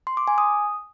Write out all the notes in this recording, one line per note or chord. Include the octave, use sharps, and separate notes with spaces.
C6
D6
G#5
D#6